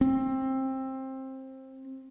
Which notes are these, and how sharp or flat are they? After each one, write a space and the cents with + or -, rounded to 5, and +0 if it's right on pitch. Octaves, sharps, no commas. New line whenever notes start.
C4 +20